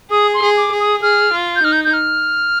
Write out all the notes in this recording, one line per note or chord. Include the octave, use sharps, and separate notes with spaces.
G#4 D#6
C6
G#4
D6
G#4
D#6
G#4 F6
F4
G6
D#4 F6
G6
G6
F6